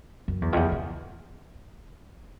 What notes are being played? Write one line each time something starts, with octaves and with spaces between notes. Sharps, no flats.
F#2
E2
F2
E2
E2